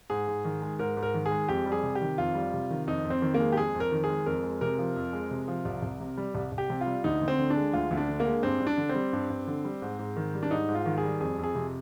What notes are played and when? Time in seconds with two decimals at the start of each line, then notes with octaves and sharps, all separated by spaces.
0.10 G#2 G#4
0.28 G#2
0.45 D#3
0.62 G#3
0.79 G#2 A#4
0.97 G#2
1.03 A#4
1.14 D#3
1.26 G#4
1.31 G#3
1.49 F2 G4
1.66 G3
1.72 G#4
1.83 C3
1.95 G4
2.01 D#3
2.18 F2 F4
2.35 G3
2.53 C3
2.70 D#3
2.87 F2 D#4
3.05 F2
3.10 C4
3.22 D#3
3.34 A#3
3.40 G#3
3.52 G4
3.57 F2 G#4
3.75 F2
3.80 A#4
3.92 D#3
4.04 G#4
4.09 G#3
4.26 F2 A#4
4.44 G#3
4.61 C3 A#4
4.78 F3
4.96 F2
5.13 G#3
5.31 C3
5.48 F3
5.65 C2
5.83 C2
6.00 C3
6.17 G3
6.35 C2
6.52 C2
6.58 G4
6.70 C3
6.81 F4
6.86 G3
7.04 D2 D#4
7.21 D2
7.28 C4
7.39 D3
7.50 D4
7.56 G#3
7.73 D2 F4
7.91 D2
7.97 D4
8.08 D3
8.20 A#3
8.26 G#3
8.43 G2 C4
8.60 G2
8.67 D4
8.78 D3
8.89 C4
8.95 G3
9.13 G2
9.30 G2
9.47 D3
9.65 G3
9.82 G#2
9.99 G#2
10.16 D#3
10.34 G3
10.43 D4
10.51 G#2 D#4
10.69 G#2
10.75 F4
10.86 D#3
10.98 G#4
11.04 G3
11.20 F2 G#4
11.38 F2
11.44 G#4
11.55 C3